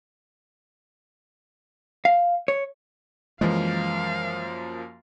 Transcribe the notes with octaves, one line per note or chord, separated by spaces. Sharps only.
F5
C#5
F#2 E3 F3 G#3 A#3 F5